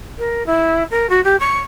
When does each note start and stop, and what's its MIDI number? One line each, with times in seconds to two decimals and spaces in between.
0.18 0.45 70
0.46 0.83 64
0.90 1.09 70
1.09 1.20 66
1.24 1.36 67
1.39 1.56 85